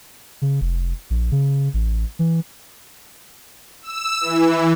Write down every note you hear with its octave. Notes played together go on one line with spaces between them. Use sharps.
C#3
F1
A#1
C#3
A1
E3
E6
E3